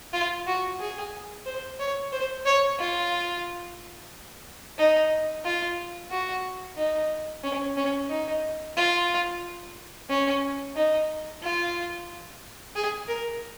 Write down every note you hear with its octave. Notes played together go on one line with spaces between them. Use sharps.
F4
F#4
G#4
C5
C#5
C5
C#5
F4
D#4
F4
F#4
D#4
C#4
C#4
D#4
F4
C#4
D#4
F4
G#4
A#4